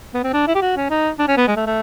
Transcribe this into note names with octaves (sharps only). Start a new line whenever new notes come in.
B3
C4
D4
E4
G4
F#4
C#4
D#4
D4
C#4
B3
G#3
A3
A3